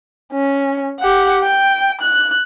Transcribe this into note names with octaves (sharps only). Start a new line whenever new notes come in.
C#4
G4 F#5
G5
F#6